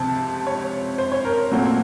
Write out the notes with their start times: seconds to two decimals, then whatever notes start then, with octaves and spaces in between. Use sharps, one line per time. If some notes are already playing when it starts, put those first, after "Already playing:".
Already playing: C#2 C3 F3 C4 A5
0.47 C#5
0.98 C5
1.12 C#5
1.25 A#4
1.51 A#2 F#3 A3 C4